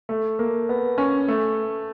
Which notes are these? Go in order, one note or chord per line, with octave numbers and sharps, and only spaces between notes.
A3
A#3
B3
C#4
A3